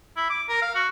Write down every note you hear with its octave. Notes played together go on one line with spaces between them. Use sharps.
E4
D6
A#4
F5
F#4